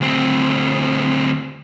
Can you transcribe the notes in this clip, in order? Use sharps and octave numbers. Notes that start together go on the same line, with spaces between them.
D2 C4